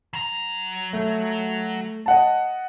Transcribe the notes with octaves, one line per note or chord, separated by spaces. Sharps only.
F#3 A#5
A3
D#5 F#5 A5